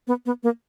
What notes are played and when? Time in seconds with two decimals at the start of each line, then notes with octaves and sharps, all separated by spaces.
0.07 B3
0.26 B3
0.43 A#3